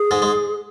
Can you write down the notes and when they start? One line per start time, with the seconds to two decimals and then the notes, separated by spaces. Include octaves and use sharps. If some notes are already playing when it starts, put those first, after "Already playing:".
Already playing: G#4
0.11 G#2 G#3
0.22 G#3